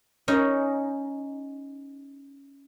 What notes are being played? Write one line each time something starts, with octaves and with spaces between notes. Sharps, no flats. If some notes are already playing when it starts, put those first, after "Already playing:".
C#4 D#4